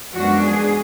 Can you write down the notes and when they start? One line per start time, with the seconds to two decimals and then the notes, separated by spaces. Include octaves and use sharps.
0.12 F#2 F3 G#3 B3 D4 F#4
0.40 G#4